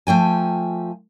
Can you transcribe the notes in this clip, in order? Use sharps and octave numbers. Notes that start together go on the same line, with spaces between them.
F3 A3 G5 G#5